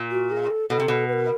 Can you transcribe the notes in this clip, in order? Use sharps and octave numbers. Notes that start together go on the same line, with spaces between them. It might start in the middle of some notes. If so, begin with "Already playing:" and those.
Already playing: A#2
F#4
G#4
A4
B2 A4
C3
B2
B4
A#4